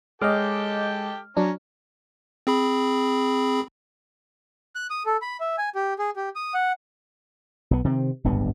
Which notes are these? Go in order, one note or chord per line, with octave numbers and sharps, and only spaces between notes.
G#3 G4 A4 C#5 D#5 G5 D6 F6
F#3 C#4 D4 A#5
C4 G#4 B5
F#6
D#6
A4
B5
E5
G#5
G4
G#4
G4
D#6
F#5
B1 B3
C3 D#3 F3 C4
D1 G#1 G2 B3